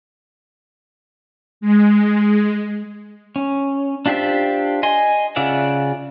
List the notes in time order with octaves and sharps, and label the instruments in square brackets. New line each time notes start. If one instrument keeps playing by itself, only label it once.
[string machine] G#3
[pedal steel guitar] C#4
D4 F4 G4 C5 E5
D#5 G#5 C6
C#3 F4 D5 E5 F#5